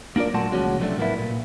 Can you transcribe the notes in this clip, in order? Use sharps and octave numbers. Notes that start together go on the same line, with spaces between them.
A#3 D4 F4 A#4 D5
A#2 F#3 A3 F#5 A5 C6
C#2 F3 G#3 A#3 C#4 F#4
C3 F3 F#3 G#3 A3 D4
A2 A#3 B3 E4
A#2